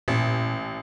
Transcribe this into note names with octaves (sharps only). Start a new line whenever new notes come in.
A1 A#2